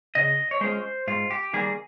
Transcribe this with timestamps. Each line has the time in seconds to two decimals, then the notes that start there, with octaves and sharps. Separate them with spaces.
0.15 C#3 D#5
0.51 C#5
0.61 G#3 C#4 F4 C5
1.07 G#2 F4
1.31 G4
1.53 D#3 G3 A#3 G#4